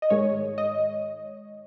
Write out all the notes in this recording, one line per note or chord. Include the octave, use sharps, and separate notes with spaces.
D#5
G#2 D#3 G#3 C#5
D#5